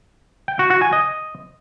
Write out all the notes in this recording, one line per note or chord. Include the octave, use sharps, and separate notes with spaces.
G5
F#4
F#4
G#5
D#5